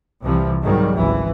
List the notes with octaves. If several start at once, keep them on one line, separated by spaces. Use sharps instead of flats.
C2 C3 E3 F3 G3
G#2 D#3 F#3 G3
G#1 C#2 E3